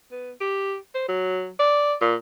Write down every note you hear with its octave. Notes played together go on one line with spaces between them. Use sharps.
B3
G4
C5
F#3
D5
A#2